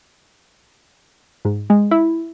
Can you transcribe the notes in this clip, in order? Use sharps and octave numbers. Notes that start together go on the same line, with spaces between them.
G#2
G#3
E4